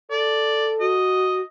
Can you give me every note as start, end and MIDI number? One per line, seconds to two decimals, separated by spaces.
0.11 0.97 69
0.11 0.72 74
0.80 1.41 66
0.80 1.43 75